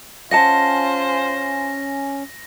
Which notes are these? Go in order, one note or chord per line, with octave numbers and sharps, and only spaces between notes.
C#4 F4 C5 D#5 F#5 A5 A#6